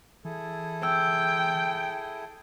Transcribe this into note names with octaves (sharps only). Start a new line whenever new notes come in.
E3 E4 G#4 A4
G5 E6